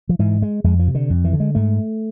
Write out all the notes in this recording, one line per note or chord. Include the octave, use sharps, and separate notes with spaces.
F3
G#2 E3
G#3
F2 G#3
F3
C3
D3
F2
E3
D3
G#3
G#2 A3